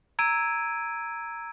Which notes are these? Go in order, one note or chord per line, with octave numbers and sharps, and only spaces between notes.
A#5 E6 G#6 D7 D#7